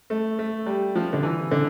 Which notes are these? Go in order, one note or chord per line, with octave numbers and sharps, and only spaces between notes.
A3
A3
G3
F3
D3
E3
D3